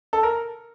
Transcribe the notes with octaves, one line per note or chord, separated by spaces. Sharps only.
A4
A#4